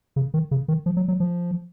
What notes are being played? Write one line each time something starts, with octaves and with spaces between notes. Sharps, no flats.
C#3
D#3
C#3
D#3
F3
F#3
F#3
F3